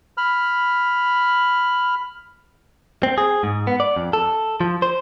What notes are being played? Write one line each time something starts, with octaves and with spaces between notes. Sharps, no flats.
B5 F6
C4
G#4
G#2
B3
D5
F2
A4
F3
C5